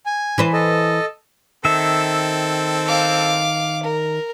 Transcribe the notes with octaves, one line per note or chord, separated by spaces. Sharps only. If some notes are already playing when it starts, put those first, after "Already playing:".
G#5
E3 B4 C5
A4 D#5
D#3 C4 A4 E5
F5 D6
A#4